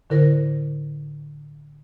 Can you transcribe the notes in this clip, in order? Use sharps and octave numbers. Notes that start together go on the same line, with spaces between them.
A2 D3 E4 A#4 C5 A#6